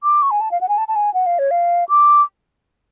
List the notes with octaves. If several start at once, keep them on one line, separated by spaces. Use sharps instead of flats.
D6
C#6
G#5
A5
F5
F#5
G#5
A5
A5
G#5
F#5
F5
C#5
F5
D6